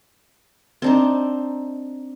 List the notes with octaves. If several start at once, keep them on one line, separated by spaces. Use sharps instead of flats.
C4 D4 D#4